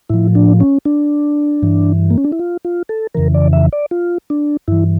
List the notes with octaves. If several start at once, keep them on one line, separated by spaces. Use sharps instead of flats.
A2 F3 E4
D4
C#4
D4
G2 E3
A#3
C#4
D4
E4
F4
F4
A4
F2 C#3 E3 A#4
D5
E5
D5
F4
D4
G2 E3 E4